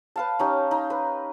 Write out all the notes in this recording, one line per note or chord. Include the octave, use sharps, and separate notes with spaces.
B4 F5 A5
C#4 D#4 G4
D#4
B4